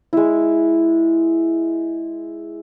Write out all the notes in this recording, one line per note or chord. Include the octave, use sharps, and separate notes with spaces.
G#3 E4